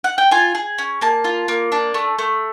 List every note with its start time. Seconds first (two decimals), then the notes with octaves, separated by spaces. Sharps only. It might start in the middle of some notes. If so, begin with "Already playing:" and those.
0.04 F#5
0.18 G5
0.31 F4 G#5
0.55 G#4
0.78 C#4
1.01 A#3 A5
1.24 F4
1.48 A#3
1.72 D4
1.94 A3
2.19 A3